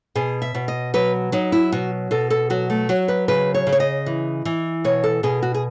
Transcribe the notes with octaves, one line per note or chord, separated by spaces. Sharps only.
B2 G#4
E5
B2
D#5
F#3 B4
F#3 D#4
E4
B2 F#4
B2 A4
A4
F#3 F#4
A3
F#3 F#4
B4
C#3 B4
C#5
C#3
C#5
D#5
E3
E3
B2 C#5
A4
B2 G#4
F#4
G#4